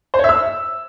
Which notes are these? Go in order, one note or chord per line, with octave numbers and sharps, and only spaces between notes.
C5
C#5
E5
E6